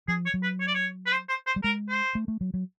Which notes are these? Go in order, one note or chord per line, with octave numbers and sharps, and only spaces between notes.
F3 G#4
C#5
F#3
B4
C#5
D5
C#5
B4
C5
C5
C5
G3
G#3 A#4
C5
A3
A3
F#3
F#3